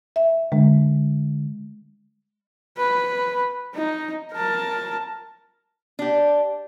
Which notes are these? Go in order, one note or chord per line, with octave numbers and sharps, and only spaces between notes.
E5
D3 G#3
B4
D#4
A#4 A5
D4 G4